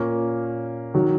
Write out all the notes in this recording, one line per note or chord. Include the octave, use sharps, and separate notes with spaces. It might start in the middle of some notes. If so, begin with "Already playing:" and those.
Already playing: A#2 A#3 C#4
D#3 F#3 D#4 F#4